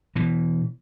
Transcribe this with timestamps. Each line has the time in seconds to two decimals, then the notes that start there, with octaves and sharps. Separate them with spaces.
0.16 B2 E3